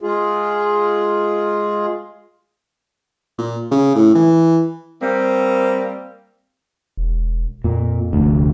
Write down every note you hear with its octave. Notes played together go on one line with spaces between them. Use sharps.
G#3 F4 G#4
A#2
C#3
A2
E3
G3 A#3 C4
E1
F2 A#2
F1 D2